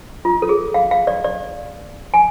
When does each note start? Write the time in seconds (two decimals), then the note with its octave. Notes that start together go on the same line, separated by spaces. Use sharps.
0.25 F4
0.42 A4
0.49 G#4
0.74 F5
0.91 F5
1.07 D5
1.24 D5
2.14 G#5